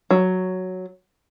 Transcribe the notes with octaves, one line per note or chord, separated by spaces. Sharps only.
F#3